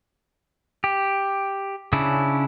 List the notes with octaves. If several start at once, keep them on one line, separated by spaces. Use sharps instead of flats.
G4
C#3 C#4 D4 E4